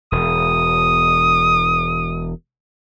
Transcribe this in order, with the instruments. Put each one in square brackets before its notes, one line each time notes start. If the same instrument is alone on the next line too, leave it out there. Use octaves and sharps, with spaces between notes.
[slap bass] E1 [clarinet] D#6